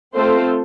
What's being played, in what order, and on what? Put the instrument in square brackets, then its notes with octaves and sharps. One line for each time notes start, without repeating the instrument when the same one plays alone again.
[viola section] A3 C4 F4 A4 C5